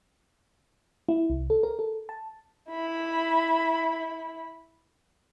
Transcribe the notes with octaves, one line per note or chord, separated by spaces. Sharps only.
E4
C2
A4
A#4
A4
A5
E4 B5